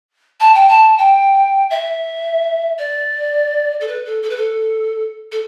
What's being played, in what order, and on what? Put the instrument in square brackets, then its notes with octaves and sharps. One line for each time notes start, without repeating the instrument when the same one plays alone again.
[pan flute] A5
G5
A5
G5
E5
D5
A4
B4
A4
A4
B4
A4
A4